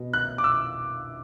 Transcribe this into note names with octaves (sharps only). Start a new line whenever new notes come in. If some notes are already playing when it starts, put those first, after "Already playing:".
Already playing: B2
F#6
D6
E6